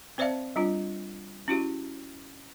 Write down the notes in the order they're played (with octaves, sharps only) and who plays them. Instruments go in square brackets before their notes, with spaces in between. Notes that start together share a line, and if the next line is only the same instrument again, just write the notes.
[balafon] C4 C5 D5 E5 F5 A5
G3 D4 F4
C#4 E4 F#4 G4